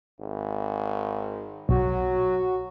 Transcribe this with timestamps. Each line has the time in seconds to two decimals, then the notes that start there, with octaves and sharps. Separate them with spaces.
0.19 G#1
1.69 B1 F#3 F#4